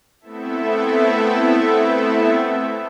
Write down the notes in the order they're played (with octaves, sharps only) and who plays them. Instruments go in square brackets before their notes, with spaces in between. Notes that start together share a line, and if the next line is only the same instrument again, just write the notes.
[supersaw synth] A3 B3 C4 E4 A4 E5